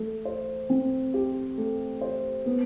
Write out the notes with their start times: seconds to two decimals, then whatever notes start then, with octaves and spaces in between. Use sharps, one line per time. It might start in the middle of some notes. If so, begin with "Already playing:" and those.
Already playing: A3
0.25 C5
0.70 C4
1.14 G4
1.58 A3
2.01 C5
2.46 B3